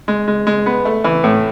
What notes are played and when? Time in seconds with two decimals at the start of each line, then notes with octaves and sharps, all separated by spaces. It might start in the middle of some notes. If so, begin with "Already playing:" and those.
0.08 G#3
0.28 G#3
0.47 G#3
0.66 B3
0.85 A3
1.04 E3
1.24 A2